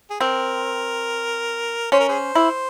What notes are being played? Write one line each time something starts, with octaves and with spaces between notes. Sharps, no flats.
G#4
C4 A#4
C#4 C5
A#4
G#4 C5
E4